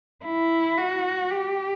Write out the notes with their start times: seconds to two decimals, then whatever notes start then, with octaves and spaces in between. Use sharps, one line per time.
0.25 E4
0.77 F#4
1.31 G4